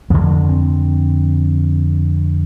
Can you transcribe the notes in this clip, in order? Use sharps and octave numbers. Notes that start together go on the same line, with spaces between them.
F2 D3 F3
C4